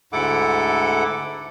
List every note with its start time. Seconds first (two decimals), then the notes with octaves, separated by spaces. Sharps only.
0.13 D2 G#2 E4 A4 F#5 D6